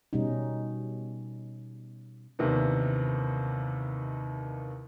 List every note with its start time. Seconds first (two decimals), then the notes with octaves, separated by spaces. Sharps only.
0.13 B2 G3 C#4 D#4
2.39 D#2 C3 D#3 E3 B3 D4